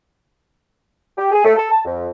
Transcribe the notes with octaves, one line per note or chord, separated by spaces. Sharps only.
G4
G#4
A3
A4
A5
F2